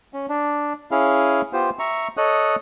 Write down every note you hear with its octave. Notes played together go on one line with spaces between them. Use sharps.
C#4
D4
C#4 E4 G#4 F5
B3 F4 G4 C5
E5 A#5 C#6
A4 C#5 D#5 D#6 F#6